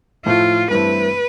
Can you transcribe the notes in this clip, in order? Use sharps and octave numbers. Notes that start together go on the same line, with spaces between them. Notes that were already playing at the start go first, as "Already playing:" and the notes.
A2 F3 A3 E4 F4
G2 E3 A3 C4 E4 B4